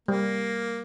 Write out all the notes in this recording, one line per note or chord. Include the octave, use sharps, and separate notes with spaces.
G3 A#3